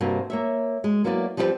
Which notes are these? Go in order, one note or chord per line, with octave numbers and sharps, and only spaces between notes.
G2 C3 A#3 C4 F#4
A#3 C#5 E5
G#3
F#3 A#3 B3 E4 D5
F3 G3 C4 E4 G4 B4